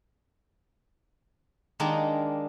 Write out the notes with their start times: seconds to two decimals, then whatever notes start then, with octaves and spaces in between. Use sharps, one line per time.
1.80 D#3 G#3 A#3 D4 D#4 G4